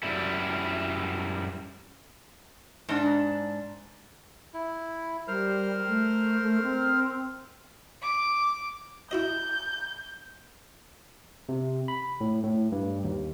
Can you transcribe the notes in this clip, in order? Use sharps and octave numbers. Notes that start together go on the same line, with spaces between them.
F#2 G3 E4
G#2 D4
E4
G3 A#4 C5 F6
A3
A3
C4
D6
E4 F#4 D#5 G6
C3
B5
A2
A2
G2
D#2